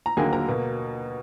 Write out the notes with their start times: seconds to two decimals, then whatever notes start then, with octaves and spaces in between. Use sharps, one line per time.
0.06 A#5
0.17 D#2 D3 F#3 A#3 G#4 G#5
0.32 A#4 A#5
0.48 B2 A#3